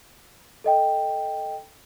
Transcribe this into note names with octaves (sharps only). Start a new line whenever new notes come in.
A4 D#5 G5